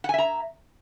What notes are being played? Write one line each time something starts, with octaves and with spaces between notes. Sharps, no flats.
E5 F#5 G#5 A#5